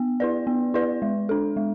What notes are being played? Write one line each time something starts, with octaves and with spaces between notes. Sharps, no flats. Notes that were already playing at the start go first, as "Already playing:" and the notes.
Already playing: B3
E4 B4 D5
B3
E4 B4 D5
G#3
D4 A4
G#3